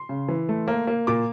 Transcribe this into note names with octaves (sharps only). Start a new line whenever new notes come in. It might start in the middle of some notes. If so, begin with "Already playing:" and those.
Already playing: C6
C#3
E3
A3
A#3
A#3
A#2 D6